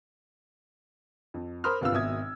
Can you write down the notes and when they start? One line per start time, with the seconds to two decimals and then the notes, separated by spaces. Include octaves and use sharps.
1.34 F2
1.64 A#4 C5 B5 C6 D#6 F6
1.81 G1 C3 F4 B4 F5 E6
1.92 G#1 B2 E5 D#6 G#6